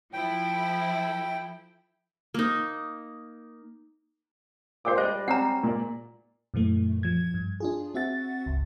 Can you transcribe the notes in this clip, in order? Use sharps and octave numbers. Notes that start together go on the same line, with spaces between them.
F3 E4 A4 G5
A#3 D#4
A#2 C5 G5 D6
G3 D4 C5 D5 D#5
C4 C#4 F#5 A#5
A#2 D5
F#2 A#2 E3 A3
F3 G#6
G2
D4 F4 G#4
C4 F#4 E5 F#5 A6
G1 C#2